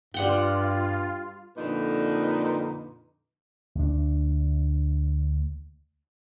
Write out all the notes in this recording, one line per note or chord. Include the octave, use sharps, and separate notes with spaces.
G2 G3 F4 F#5 G5
F2 A#2 D3 D#4 B4
D2 D4